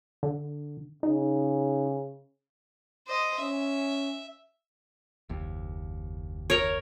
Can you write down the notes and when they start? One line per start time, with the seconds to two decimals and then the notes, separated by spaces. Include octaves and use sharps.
0.23 D3
1.03 C#3 D#4
3.08 C5 D#5
3.40 C#4 E5
5.29 F#1 D#2
6.50 A#4 C#5